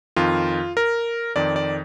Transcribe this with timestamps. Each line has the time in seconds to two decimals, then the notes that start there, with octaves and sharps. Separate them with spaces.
0.16 F2 D#3 F4
0.77 A#4
1.36 F2 D#3 D5
1.56 D5